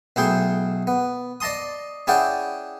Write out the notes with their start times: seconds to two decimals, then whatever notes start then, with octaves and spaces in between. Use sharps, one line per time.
0.16 B1 A3 E4 G#4 G5 C6
0.87 B3
1.40 D5 D#5 A5 C6 D#6
2.07 C#4 E4 G#4 D5 F#5 G5